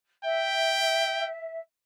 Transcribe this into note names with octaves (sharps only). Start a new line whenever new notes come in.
E5 G5